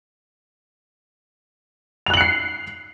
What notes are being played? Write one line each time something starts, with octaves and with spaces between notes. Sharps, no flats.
F#6 C7 C#7 F7 F#7